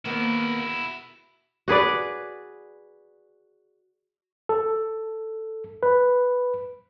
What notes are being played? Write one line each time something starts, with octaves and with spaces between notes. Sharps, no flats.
D#3 A#3 B3 E4 F#4
F#4 G#4 B4 D5
A4
B4